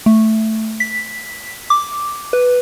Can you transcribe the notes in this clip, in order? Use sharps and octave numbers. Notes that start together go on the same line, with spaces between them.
A3
B6
D6
B4